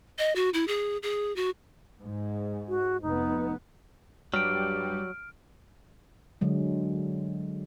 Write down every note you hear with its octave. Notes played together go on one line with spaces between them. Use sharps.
D#5
F#4
E4
G#4
G#4
F#4
G#2
F#4
F1 B3 D#4
G2 F#3 G3 F6 D7
D3 F#3 G#3